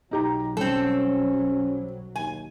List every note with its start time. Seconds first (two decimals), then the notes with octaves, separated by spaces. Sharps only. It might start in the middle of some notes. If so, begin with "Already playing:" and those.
0.11 B1 F#3 D#4 G4 A#5
0.57 G3 C4 C#4 A4
2.16 D#2 G#5